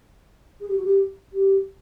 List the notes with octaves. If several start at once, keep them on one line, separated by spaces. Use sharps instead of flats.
G#4
G4
F#4
G4
G4